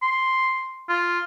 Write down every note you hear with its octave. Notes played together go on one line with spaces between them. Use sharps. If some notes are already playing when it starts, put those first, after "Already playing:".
C6
F4